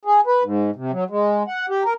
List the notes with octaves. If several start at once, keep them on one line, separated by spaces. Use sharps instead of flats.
G#4
B4
G#2
C3
F#3
G#3
F#5
G4
A#4